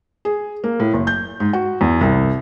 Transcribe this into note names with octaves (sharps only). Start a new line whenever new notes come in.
G#4
A#3
A2
F#1
G6
G#2
F#4
E2
C2